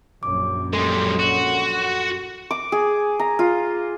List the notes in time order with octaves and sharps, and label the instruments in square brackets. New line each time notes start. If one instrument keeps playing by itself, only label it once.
[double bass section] A#1 F#2 [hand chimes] D6
[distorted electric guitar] G3 G#3 [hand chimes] A4 C6
[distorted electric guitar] F#4
[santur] D6
G#4
A#5
F4